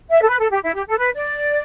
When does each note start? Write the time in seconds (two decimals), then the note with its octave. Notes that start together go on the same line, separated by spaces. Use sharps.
0.10 E5
0.22 A4
0.29 B4
0.39 A4
0.51 G4
0.63 E4
0.75 G4
0.89 A4
0.98 B4
1.15 D5